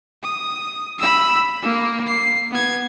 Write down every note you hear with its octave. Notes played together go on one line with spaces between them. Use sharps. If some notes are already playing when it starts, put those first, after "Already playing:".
D#6
B5 E6
A#3
C7
B3 G#6